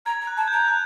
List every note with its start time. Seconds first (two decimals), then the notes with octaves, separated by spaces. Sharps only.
0.06 A#5 G#6
0.21 A#5
0.27 F#6
0.37 A5
0.48 A#5 G6
0.68 F#6